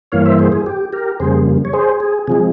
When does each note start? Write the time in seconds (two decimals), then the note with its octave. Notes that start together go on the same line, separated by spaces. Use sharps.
0.12 G2 E3 A#3 C#5 F5
0.25 C5 E5
0.39 G#4 C5
0.52 G#4
0.66 G4
0.93 G4 A#4
1.20 F2 C#3 G3 A#3 G#4 C5
1.65 C#5
1.73 G#4 C5
2.00 G#4
2.27 C3 F3 G#3 G#4